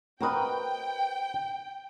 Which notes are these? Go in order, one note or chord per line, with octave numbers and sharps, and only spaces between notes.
C4 F#4 A#4 B4 D#5 G5